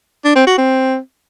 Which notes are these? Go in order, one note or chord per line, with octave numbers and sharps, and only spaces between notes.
D4
C4
F#4
C4